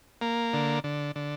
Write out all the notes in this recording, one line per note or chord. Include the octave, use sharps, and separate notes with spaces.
A#3
D3
D3
D3